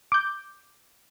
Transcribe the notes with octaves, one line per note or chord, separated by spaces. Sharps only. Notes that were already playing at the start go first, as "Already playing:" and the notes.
D6 G6